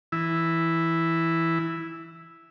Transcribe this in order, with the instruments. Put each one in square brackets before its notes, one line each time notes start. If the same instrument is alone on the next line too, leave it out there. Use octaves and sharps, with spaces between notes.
[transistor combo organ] E3 E4